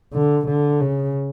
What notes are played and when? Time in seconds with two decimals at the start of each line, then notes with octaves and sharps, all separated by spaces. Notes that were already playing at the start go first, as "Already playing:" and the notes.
0.13 D3
0.47 D3
0.81 C#3